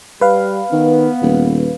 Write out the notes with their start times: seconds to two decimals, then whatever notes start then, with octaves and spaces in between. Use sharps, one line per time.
0.21 G3 B4 F5
0.72 D#3 B3
1.22 D#1